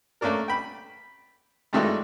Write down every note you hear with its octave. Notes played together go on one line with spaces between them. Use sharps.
A3 A#3 C#4 D4 A#4
G5 B5
G2 D#3 G#3 A3 E4 F#4